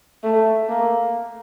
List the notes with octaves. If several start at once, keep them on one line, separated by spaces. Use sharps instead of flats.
A3
A#3